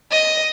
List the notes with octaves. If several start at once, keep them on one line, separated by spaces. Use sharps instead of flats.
D#5